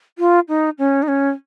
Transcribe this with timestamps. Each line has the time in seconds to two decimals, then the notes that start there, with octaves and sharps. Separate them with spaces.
0.19 F4
0.49 D#4
0.79 C#4
1.03 D#4
1.08 C#4